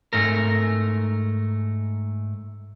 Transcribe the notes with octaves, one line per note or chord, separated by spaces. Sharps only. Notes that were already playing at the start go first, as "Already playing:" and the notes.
G#2 A3 A#4